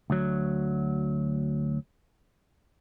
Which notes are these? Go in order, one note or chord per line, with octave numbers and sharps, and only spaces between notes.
D2 F#3